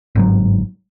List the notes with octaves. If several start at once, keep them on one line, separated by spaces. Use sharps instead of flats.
G1 G#2 F#3